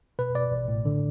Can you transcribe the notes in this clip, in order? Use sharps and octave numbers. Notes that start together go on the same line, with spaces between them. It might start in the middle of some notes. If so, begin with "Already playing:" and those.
B2 B4
B2 D5
A1
A2
D3